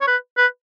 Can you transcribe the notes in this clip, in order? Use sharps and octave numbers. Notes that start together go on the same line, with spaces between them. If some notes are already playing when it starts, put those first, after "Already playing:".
C#5
B4
B4